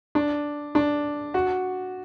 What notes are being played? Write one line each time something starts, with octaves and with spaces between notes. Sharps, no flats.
D4
D4
F#4